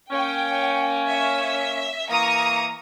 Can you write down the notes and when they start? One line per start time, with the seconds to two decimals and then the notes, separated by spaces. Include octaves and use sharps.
0.11 A#3 C#4 G5
1.08 E5
2.10 E3 A#3 A#5 C#6 D#6